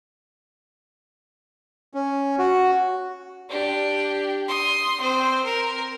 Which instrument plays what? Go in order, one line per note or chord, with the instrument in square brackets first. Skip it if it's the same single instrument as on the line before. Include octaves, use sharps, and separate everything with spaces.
[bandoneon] C#4
F#4
[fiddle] D4 G4
C6 D#6
C4 C5
A#4